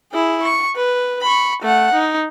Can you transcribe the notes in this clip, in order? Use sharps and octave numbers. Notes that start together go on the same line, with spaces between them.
E4 G#4
C#6
B4
B5 C#6
A3 F#5
D#4